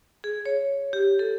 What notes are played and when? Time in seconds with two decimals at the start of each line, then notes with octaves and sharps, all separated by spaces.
0.24 G#4
0.45 C#5
0.93 G4
1.19 A4